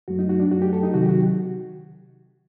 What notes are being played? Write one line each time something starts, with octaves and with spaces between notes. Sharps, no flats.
F#2 F#3 A3 F#4
D#4
F#4
D4
F#2 F#3 A3 F#4
G4
A4
D#4
C3 D#3 F#3 F#4
G4
F#4